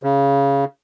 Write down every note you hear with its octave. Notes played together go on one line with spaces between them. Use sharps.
C#3